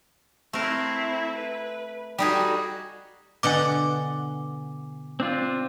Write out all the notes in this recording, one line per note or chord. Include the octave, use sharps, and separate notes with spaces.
A3 C4 E4 A#4
B4
G3 D#4 F#4 G#4 A4
B2 D3 F#5 G#5 D6
C4 D4 F4